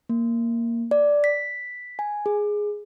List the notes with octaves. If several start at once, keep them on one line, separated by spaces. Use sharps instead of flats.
A#3
D5
B6
G#5
G#4